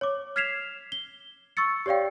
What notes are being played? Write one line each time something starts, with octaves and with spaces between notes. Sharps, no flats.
C#5 D6
F6 G#6 B6 C7 E7 F7
G7
C#6 E6 A6 C#7
G4 C#5 D5 F5 G5